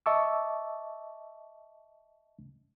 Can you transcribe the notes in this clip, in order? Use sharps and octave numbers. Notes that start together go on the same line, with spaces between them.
D#5 E5 A5 C#6 D6 E6